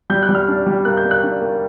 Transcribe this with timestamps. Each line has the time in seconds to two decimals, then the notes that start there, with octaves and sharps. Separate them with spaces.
0.10 G3 G6
0.23 F#6
0.29 G3
0.35 F6
0.48 D4
0.66 G3
0.85 A#3 F#6
0.97 G6
1.04 A#3
1.11 F#6
1.23 D4
1.42 A#3